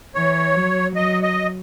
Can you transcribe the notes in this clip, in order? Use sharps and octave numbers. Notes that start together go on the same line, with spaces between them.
E3 C#5
F#3
F#3 D#5
D#5